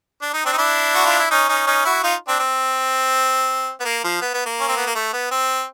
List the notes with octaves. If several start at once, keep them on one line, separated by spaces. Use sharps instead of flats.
D4
D#4
C4 D4
D#4
D4 E4
F#4
F4
E4
C#4 D#4
C#4 D#4
C#4 D#4
E4 F#4
D#4 F4
C4 D4
C4
B3
A#3
F3
B3
B3
A#3
C#4
C4
B3
A#3
A3
B3
C4